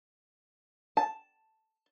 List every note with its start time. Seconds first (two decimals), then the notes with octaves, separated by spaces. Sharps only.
0.97 A5